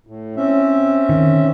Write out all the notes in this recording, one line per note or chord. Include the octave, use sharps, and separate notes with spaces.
A2
C4 C#4 E5
D#3